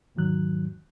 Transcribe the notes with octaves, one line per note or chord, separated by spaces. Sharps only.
E2 G#2 D#3 F#3 F#6